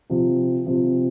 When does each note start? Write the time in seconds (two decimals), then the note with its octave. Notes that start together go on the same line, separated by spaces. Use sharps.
0.10 C3 F3
0.66 C3 F3